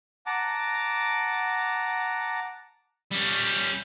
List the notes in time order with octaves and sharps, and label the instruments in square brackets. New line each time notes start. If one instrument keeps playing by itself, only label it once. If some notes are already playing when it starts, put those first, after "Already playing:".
[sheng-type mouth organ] F#5 A5 A#5 D6
[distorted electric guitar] G3 C#4